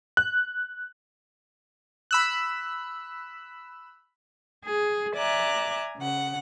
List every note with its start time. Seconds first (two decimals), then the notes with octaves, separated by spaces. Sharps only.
0.17 F#6
2.11 B5 E6 F#6
4.66 G#4
5.17 D5 E5 G#5 A#5 D6 F#6
5.97 C#3 F#5